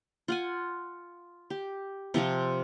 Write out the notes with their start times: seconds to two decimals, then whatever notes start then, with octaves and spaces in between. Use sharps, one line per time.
0.28 F4 F#5 G#5
1.50 G4
2.14 C3 F3 C4 F4